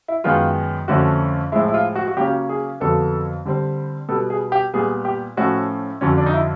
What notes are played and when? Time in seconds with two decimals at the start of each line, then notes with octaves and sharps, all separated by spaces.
0.08 E4
0.24 F#2 D#3 G#3 B3 F4
0.88 F2 D3 F3 A3 C#4 F#4
1.52 A2 F3 G#3 E4
1.68 E4
1.74 F4
1.95 F#4
2.08 F#4
2.17 C#3 F#3 A#3 C#4 G4
2.49 G#4
2.80 F2 D3 F#3 B3 A4
3.45 D3 G3 C4
4.09 B2 G3 B3 A4
4.30 G#4
4.52 G4
4.74 A#2 G3 B3 G#4
5.05 G4
5.37 A2 F3 A3 C#4 F#4
6.01 F2 D3 F#3 C#4
6.17 D4
6.26 D#4
6.34 E4